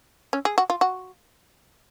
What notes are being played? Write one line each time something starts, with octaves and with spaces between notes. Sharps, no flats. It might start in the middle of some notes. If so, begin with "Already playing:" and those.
C#4
G#4
F#4
F4
F#4